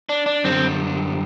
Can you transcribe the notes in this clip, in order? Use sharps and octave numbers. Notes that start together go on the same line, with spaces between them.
D4
D4
F#2 D3 G3 C4 D4